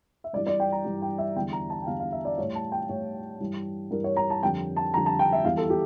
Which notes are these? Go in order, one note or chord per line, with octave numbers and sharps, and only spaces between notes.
E5
G2 E3 G3 D5
D5
G5
A#5
G2 E3 G3
G5
E5
E2 D3 G3 G5
A#5
A5
G5
E2 D3 G3 F5
F5
E5
D5
A2 G3 C#5
A5
G5
A2 G3 C#5
G2 E3 G3
G2 E3 G3 A#4
C#5
A#5
A5
F2 D3 G3 G5
A5
F2 D3 G3 A#5
A5
G5
E5
E2 E3 G3 F5
A4
G4